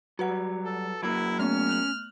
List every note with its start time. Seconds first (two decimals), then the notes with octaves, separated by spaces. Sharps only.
0.19 F#3 G3 F#4 B4 F#5
0.65 A4
1.03 F#3 A#3 E4
1.39 A3 B3 C#4 F6
1.69 F#6 F7 F#7